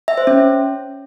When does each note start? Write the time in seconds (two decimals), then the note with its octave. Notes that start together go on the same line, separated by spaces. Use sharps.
0.08 E5
0.18 C5
0.27 C#4